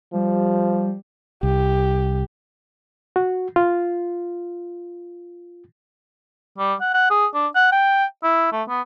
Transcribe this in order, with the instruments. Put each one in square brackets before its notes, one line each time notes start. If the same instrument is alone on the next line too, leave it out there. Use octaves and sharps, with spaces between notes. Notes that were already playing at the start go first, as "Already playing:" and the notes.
[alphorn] F3 [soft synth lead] G3
[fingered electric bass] C2 [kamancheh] G4
[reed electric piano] F#4
F4
[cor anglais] G3
F#5
F#5
G#4
D4
F#5
G5
E4
A3
B3